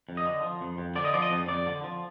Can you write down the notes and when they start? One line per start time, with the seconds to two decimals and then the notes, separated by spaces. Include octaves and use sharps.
0.09 F2
0.17 D#5
0.26 D3
0.43 F3
0.61 F2
0.78 F2
0.96 D3 D5
1.05 D#5
1.14 F3 D5
1.22 D#5
1.31 F2
1.48 F2 D5
1.67 D3
1.84 F3